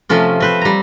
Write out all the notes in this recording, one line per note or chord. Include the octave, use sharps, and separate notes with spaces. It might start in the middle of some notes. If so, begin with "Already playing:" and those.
C3 F3 A3 C#4 F4
C4 B4 C5
G3 A#5